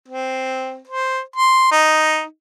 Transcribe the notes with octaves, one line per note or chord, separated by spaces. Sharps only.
C4
C5
C6
D#4